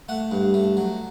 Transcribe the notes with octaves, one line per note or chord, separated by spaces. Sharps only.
A3 F#5
G2
A3
F#3